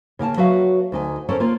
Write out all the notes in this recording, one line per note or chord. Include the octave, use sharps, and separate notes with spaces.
C#3 A#3 G#5 A5
F#3 F#4 B4 E5 F5
D2 D#4 G#5
C#4 A4 A#4 C5 C#5
A#3 F4 A#4